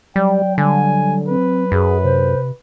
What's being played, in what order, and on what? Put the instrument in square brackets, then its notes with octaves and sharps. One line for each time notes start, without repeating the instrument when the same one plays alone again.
[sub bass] F#3 [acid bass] G3 [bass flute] D5 [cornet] G5
[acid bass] D3 [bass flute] G3 [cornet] G#5
[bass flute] C4 [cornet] B4
[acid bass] F#2 [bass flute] G#4
[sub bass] C3 [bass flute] C5